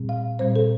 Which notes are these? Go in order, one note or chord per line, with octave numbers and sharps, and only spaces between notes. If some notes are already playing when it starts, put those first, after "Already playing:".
Already playing: A#2 G3 C4
F5
A#2 G3 C4 C5
A4